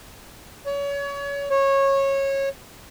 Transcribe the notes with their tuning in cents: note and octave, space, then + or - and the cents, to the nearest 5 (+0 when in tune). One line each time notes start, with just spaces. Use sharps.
C#5 +30
C#5 -20